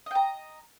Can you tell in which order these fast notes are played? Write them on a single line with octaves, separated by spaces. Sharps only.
D#5 G5 A#5